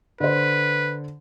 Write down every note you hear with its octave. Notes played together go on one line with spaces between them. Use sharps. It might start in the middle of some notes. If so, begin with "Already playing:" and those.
D3 B4 C5